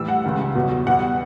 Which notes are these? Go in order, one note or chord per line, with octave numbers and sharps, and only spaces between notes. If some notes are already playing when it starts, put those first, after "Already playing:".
Already playing: A2 E3 G3 E6
F#5
C#2 C#3 G3
E2 B2 F#3
E2 B2 G3 F#5